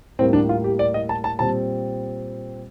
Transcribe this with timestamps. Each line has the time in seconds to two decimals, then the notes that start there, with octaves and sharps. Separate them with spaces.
0.19 A2 G3 A#3 C4
0.33 D4
0.49 F4
0.64 G4
0.79 D5
0.94 D#5
1.09 A5
1.24 A5
1.39 A#2 G3 C4 A5